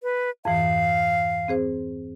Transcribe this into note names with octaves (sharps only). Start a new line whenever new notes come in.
B4
F2 G#2 E3 F5
C4 G#4 C5